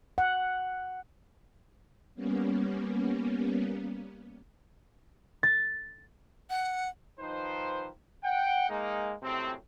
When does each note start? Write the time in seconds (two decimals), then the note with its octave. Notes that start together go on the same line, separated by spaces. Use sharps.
0.18 F#5
2.15 G3 A#3 B3 C#4
5.43 A6
6.50 F#5
7.19 D#3 F3 D#4 B4 C5
8.24 F#5 G5
8.69 G#3 A#3 D#4
9.22 F#2 A2 C3 G#3 C4